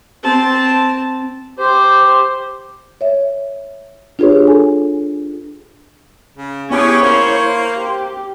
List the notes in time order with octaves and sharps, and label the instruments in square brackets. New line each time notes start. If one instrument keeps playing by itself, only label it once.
[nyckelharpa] C4 A5
[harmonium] G4 [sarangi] C5
[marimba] C#5 E5
D4 F4 G4 G#4 B4 C#5
A4 G#5
[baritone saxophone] C#3
[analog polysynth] B3 G4 G#4 [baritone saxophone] C#4 [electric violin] E4 C#5
[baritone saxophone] A#3 [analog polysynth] C5
[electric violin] G4